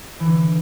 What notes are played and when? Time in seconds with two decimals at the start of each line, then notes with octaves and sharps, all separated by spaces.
0.20 E3
0.26 D3